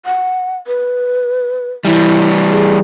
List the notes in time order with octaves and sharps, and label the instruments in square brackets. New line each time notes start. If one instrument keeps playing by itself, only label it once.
[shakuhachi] F#5
B4
[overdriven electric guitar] E3 G3 [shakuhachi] E4
[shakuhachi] G#4